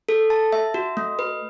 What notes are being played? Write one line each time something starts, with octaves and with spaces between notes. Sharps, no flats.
A4
A5
E5
F#4
A3
B4